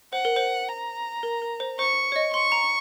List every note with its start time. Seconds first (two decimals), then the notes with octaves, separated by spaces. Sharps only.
0.13 C5 F#5
0.25 A#4
0.36 C5
0.69 A#5
1.23 A#4
1.42 A#4
1.60 C5
1.79 C5 C#6
2.12 C#5
2.16 D#5
2.34 C6 C#6
2.52 A#5